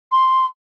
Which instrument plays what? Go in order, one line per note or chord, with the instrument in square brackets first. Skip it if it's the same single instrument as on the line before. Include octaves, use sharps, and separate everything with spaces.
[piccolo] C6